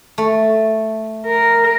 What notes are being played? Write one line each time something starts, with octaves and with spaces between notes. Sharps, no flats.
A3
A#4